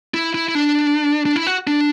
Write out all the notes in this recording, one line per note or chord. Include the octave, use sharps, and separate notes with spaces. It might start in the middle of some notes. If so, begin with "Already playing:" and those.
E4
E4
E4
D4
D4
E4
F#4
D4